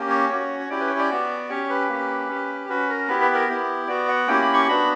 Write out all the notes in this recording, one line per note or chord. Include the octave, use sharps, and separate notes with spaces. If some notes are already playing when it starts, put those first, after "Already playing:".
Already playing: A#3 C#4 G4
C#5
C#4 F#4
C#5
C#4 E4 G4 D5
B4
C#5
D5
B3 F#4
C#4 G4 C#5
B4
A#3 C#4 G4
C#4 G4
C#4 F#4 B4
A#4
B3 E4 G4 B4
B4
A#4
B3 E4 G4
B3 F#4 D5
F#5
A#3 C#4 E4 G4 G5
B5
C#6
B3 D4 F#4 B5